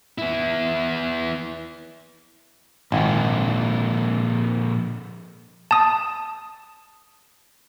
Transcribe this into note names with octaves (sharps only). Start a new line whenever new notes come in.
B3 E4
G#1 A#2 D3 F3
A5 D#6